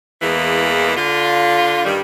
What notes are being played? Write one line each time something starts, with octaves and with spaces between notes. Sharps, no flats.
E2 E3 G#3 A#3
D3 F4
G2 D#3 G3